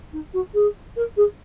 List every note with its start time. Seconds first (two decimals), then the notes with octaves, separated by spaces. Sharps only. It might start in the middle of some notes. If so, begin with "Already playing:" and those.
0.12 D#4
0.33 F#4
0.54 G#4
0.96 A#4
1.16 G#4